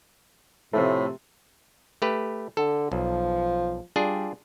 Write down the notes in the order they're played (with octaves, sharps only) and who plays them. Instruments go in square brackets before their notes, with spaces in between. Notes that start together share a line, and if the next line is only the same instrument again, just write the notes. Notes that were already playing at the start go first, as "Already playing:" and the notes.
[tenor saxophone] A2 [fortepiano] C3 F3 A3
[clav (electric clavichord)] A3 G4 B4
[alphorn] D3 [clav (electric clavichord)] A4
[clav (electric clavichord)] B1 [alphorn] F3
[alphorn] G3 [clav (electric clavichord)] D4 F4 G#4